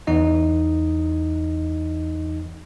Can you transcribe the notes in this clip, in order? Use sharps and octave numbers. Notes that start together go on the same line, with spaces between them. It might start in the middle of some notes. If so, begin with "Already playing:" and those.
E2 E3 D#4 D#5